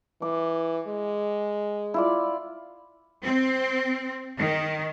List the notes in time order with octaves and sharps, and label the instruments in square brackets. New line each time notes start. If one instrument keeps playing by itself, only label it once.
[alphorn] E3 [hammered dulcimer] D6
[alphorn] G#3
[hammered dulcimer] E4 F4 D5
[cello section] C4
D#3